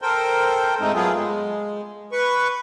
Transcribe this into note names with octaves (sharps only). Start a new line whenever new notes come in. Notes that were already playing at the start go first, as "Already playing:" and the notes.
A4 A#4 C5 G5
G#2 G#3 A3 C4 D#4
F#3 A3 B3 F4 G#4
G#3
B4 C#6